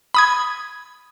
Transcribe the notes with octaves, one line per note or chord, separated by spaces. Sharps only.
B5 D#6 G#6